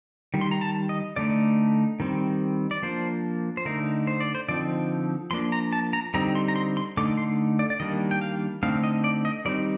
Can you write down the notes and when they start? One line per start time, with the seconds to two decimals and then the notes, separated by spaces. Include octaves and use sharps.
0.34 D#3 G3
0.41 C6
0.51 A#5
0.61 A5
0.89 D#5
1.16 D3 A3 D#4 D5
2.00 D#3 G3 C4
2.71 D5
2.82 F3 A#3 D4 C5
3.57 C5
3.65 D3 A3 D#4 A#4
4.07 C5
4.20 D5
4.35 C5
4.48 D3 F3 C4 D#4 D5
5.31 F3 A#3 D4 C6
5.52 A#5
5.73 A5
5.93 A#5
6.14 D3 G3 C4 D#4 A#5
6.35 C6
6.48 A#5
6.56 C6
6.77 C6
6.97 D3 A3 D#4 D6
7.17 C6
7.59 D5
7.70 D5
7.80 D#3 G3 A#3 D4 D#5
8.11 G5
8.21 F5
8.63 D3 A3 C4 D#4 F5
8.84 D#5
9.04 D5
9.25 D#5
9.45 D#3 G3 C4 D#4 D5